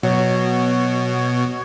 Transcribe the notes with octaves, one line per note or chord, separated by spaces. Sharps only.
B2 F#3 F#4 C#5